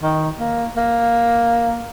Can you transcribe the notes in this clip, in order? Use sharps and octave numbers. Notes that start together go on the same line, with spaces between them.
D#3
A#3
A#3